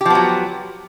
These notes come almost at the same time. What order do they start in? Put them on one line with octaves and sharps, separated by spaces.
G4 F3 B3 F#3